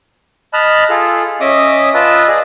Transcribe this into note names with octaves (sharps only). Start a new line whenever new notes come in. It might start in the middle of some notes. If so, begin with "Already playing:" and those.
D#5 A5 B5 F6 F#6
F4 G#4 A4
C#4 D#5 E5 D6 D#6
F4 B4 D#5 A5 E6
G#4 D5 D#5